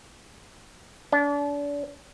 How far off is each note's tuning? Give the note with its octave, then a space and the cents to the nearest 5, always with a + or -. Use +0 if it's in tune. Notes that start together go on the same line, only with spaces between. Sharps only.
D4 -35